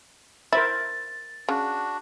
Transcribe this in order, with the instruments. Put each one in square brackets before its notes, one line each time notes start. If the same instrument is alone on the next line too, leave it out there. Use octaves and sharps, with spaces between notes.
[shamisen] E4 [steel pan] A#4 C5 E5 [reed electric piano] A6
[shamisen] C#3 [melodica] D4 F#4